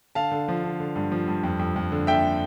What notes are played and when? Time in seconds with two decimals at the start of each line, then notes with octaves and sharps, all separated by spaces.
0.15 D3 F5 A5
0.31 D3
0.48 F3
0.64 D3
0.80 D3
0.96 G2
1.12 F3
1.28 G2
1.43 F2
1.59 F2
1.76 F2
1.92 D3
2.07 D3 E5 G5